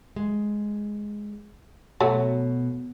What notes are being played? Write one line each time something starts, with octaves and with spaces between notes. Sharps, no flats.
G#3
B2 F#3 A3 F#4